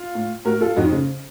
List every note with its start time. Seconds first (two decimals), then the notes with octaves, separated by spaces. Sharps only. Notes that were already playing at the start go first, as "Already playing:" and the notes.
Already playing: F4
0.15 A2
0.45 A2 F#4 A#4
0.60 F4 A4
0.76 F2 D#4 F#4
0.92 C#3